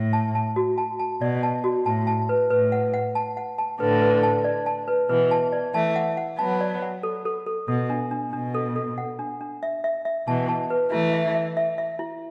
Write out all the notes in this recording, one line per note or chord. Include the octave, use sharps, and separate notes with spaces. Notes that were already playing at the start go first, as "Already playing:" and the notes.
Already playing: A2
A5
A5
F#4
A5
A5
B2 D5
A5
F#4
A2 A5
A5
B4
A2 B4
F#5
F#5
A5
F#5
A5
A2 D3 B4
B4
A5
D5
A5
B4
B2 E3 B4
A5
D5
E3 A3 A5
F#5
F#5
F#3 B3 A5
D5
F#5
A4
A4
A4
B2 A4
D4
D4
B2 D4
A4
A4
F#5
D4
D4
E5
E5
E5
B2 E3 A5
A5
B4
E3 A3 E4
E5
E5
E5
E5
E4